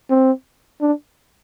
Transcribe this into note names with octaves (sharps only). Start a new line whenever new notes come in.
C4
D4